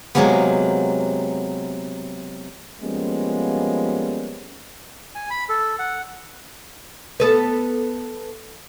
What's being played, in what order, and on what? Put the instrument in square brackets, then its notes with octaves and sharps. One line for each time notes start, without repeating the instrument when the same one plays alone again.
[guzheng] C3 F#3 G#3 A#3 B3
[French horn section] F3 G3 G#3 A#3 B3 C#4
[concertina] G#5
B5
A4
F#5
[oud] B3 A4 B4